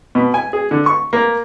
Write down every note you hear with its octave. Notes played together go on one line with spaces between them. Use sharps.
B2
G#5
G#4
D3
C#6
A#3